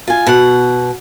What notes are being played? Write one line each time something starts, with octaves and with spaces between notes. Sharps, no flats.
F4 G#5
B2 F#5